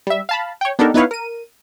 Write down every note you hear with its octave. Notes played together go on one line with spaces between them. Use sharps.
G3 E5
F5 A5 B5
C#5 G5
B3 D4 D#4 G4 A4 A#4
B3 D#4 E4 B4 C#5 F5
A#4 D#7